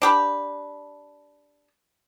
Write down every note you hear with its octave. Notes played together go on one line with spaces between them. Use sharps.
D4 G4 B4